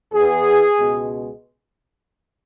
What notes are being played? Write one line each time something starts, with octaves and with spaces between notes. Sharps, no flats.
E2 E3 B3 G#4
C#2 B2 G#3 B3